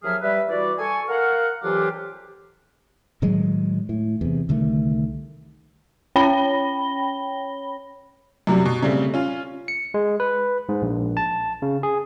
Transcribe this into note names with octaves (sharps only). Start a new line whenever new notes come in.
D#2 F3 F#3 G#4 E5 F6
G3 B4 E5
E3 G3 F#4 D5
A4 G#5 C#6
A#4 F5 F#5
F2 E3 F#3 D4 F4 G4
A2 D#3 F#3 G#3
A2
E2 C3
C2 D3 D#3 A3
C#4 C#5 G5 B5 A#6 G7
F#2 C3 F#3 G3
B2
C#3 G3 A3 C4
C#4 F4
C#7
G#3
B4
G#2
A#1
A5
C#3
G#4